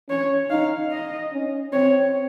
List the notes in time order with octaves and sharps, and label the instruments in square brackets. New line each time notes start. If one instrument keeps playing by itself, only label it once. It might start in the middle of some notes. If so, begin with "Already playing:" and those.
[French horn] C#4 [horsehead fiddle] C#5
[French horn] D#4 [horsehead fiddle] F5
[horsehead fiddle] D#5
[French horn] C#4
[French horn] C4 [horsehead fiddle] C#5